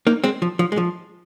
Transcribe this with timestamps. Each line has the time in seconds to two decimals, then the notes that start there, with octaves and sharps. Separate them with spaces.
0.07 A#3 D#4
0.24 G#3 C4
0.42 F3
0.59 F3
0.72 G#3
0.77 F3